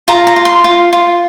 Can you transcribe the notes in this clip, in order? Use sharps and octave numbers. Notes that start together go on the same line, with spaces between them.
F4 A#5
A#5
F4
C6
F4
F4